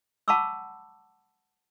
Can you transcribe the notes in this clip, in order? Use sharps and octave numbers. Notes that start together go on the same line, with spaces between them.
F#5 A5 B5 C#6 D6 E6